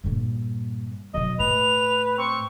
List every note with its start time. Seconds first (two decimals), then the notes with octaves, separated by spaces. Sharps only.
0.04 G2 A#2
1.14 B1 F#3 D#5
1.40 A2 B4 F7
2.18 C4 C#6